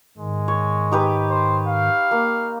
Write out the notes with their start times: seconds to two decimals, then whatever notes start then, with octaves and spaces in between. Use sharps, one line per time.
0.18 G#2 D#3 G#3
0.48 C#5
0.92 D#4 G4 B4
1.30 C5
1.67 F5
2.11 A#3